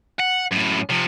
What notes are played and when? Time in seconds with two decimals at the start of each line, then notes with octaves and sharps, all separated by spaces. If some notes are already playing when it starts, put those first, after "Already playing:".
0.19 F#5
0.51 F#2 A2
0.89 C3 F3